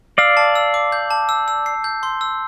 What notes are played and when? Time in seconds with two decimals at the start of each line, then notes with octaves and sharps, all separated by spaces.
0.18 D5 F5 E6
0.37 A5
0.56 E6
0.74 D6
0.92 G6
1.11 A5
1.29 E6
1.48 E6
1.66 C7
1.84 G6
2.03 C6
2.21 E6